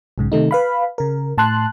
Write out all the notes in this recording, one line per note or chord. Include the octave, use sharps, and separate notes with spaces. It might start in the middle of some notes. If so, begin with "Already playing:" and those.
B1 G#2 C#3
C3 D#3 A3 D#4
B4 F5 B5
C#3 A#4
A2 A5 C6 F#6